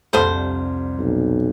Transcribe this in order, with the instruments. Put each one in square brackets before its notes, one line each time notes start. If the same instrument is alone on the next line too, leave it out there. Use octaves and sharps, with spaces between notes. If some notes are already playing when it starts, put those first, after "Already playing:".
[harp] C2 F2 [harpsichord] G#2 A3 D#6 [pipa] D3 G3 C5
[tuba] B1